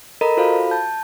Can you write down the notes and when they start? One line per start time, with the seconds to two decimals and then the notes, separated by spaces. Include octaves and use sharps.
0.21 A4 A#4 D#5 A#5 B5
0.37 F4 F#4 A4 C5 F5 B5
0.71 A5 G6